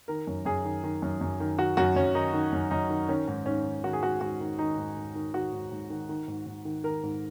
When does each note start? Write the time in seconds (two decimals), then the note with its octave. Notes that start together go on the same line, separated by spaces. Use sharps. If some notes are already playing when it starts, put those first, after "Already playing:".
0.08 D#3 A#4
0.27 F#2
0.45 F#2 G#4
0.65 D#3
0.84 D#3
1.02 F#2
1.21 F#2
1.40 D#3
1.58 D#3 F#4
1.77 F#2 F#4
1.96 F#2 C#4
2.15 D#3 D#4
2.33 D#3
2.53 F#2
2.71 F#2 D#4
2.90 D#3
3.09 D#3 C#4
3.28 G#2
3.46 G#2 C#4
3.65 D#3
3.84 D#3 F#4
3.93 G#4
4.02 G#2 F#4
4.21 G#2 F#4
4.40 D#3
4.59 D#3 D#4
4.78 G#2
4.97 G#2
5.15 D#3
5.34 D#3 F#4
5.53 G#2
5.72 G#2
5.90 D#3
6.09 D#3
6.28 G#2
6.46 G#2
6.65 D#3
6.84 D#3 A#4
7.03 G#2